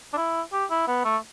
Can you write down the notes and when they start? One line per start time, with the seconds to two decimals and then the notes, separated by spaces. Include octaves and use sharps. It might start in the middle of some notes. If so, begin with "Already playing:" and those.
0.13 D4
0.17 E4
0.53 G4
0.70 E4
0.88 B3
1.05 A3